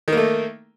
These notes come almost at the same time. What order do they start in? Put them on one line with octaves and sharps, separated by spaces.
D#3 A#3 A3